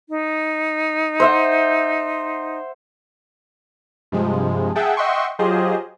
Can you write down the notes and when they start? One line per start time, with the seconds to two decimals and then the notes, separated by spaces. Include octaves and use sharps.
0.09 D#4
1.20 C5 E5 F#5
4.12 G2 C3 F3 G#3
4.75 G#4 E5 F#5 G5 A5
4.97 D#5 E5 F#5 G5 C6 C#6
5.39 F#3 F4 G4 G#4 C5 D#5